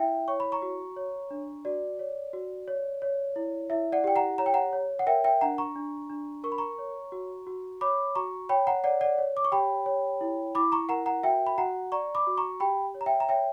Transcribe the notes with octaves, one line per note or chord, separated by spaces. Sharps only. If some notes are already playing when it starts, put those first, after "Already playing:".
Already playing: E4 E5 G5
C#5 C#6
B5
A#5 C#6
F#4
C#5
D4
F#4 D5
C#5
F#4
C#5
C#5
E4
E4 E5
D5 F#5
G4 G5
F#5 A#5
C#5 A#5
G5
F#5 A#5
C#5
F#5
A#4 E5 G5
E5 G5
D4 F#5 A#5
A#5 C#6
D4
D4
A#4 C#6
B5
A#5 C#6
C#5
F#4
F#4
C#5 B5 D6
F#4 A#5 C#6
C#5 G5 B5
F#5 A#5
C#5 D5 F#5
D5 F#5
C#5
D6
C#6
G4 G5 B5
C#5
E4
E4 B5 D6
A#5 C#6
A#4 F#5 A#5
F#5 A#5
F#4 E5 G5
B5
F#4 F#5 A#5
D5 A#5 C#6
B5 D6
F#4
A#5 C#6
G4 G5 B5
C#5
A#5
E5 G5
A#5
C#5 E5 G5